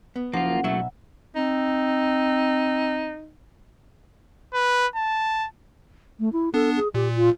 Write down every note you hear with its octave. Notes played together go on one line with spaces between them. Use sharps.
B3
F#1 F3 A#3 F4 F#5
B1 F#3 A3 E5
C4 D#4
B4
A5
A3
E4
B3 D4 A4
G#4
A#2 G4
F4